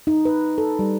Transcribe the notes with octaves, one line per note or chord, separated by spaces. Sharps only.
D#4
B4
A4
G3